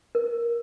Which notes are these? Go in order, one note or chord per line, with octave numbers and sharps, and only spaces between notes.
A#4